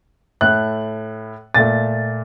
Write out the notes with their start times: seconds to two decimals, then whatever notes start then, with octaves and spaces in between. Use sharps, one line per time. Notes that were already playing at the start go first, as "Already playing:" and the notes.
0.41 A2 A3 F#6
1.55 A#2 A3 A6